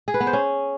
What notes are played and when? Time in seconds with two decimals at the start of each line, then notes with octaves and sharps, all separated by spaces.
0.08 G#4
0.14 B4
0.20 B3
0.27 C5
0.33 C#4